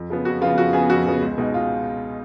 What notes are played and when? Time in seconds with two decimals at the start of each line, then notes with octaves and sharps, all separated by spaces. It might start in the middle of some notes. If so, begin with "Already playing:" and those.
Already playing: F2
0.10 C#3 F3 B3
0.25 F2 F#4
0.41 C#3 F3 B3 F4
0.58 F2 F#4
0.73 C#3 F3 B3 G#4
0.90 F2 F#4
1.06 C#3 F3 B3
1.22 C#2
1.38 B2 G#3 D#4
1.54 F4